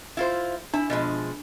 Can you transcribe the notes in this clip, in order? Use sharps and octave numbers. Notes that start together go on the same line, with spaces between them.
E4 F4 C5
D4 E4
B2 F3 G#3